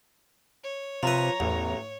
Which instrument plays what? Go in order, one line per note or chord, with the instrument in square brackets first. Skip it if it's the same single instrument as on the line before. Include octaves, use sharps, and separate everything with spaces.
[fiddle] C#5
[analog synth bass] C3 [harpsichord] F3 B4 [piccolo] A#5
[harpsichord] A1 [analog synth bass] E2